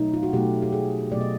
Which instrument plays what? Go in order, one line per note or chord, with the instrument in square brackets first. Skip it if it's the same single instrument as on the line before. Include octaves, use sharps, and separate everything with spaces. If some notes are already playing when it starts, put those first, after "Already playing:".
Already playing: [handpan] B2 F#3 A3 D#4
F4
F#4
B2 F#3 A3 G4
G4
G#4
B2 F#3 A3 D5
D#5